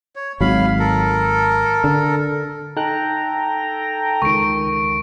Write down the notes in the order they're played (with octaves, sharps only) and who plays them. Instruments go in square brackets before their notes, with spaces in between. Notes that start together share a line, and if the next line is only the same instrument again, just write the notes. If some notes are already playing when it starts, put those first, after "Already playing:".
[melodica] C#5
[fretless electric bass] G#1 F#3 [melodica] F5 B5
[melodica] A4 A#4
[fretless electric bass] D3
[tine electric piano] D#4 F#6 [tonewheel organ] A4 G5 A#5
[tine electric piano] C#2 D#3 [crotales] C#6 D7